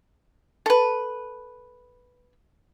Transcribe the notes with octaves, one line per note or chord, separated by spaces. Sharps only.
A4 B4